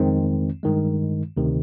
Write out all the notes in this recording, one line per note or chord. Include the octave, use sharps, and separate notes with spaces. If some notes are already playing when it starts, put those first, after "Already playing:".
Already playing: F2 D#3 G#3 C4
G2 D#3 G#3
D2 C3 D#3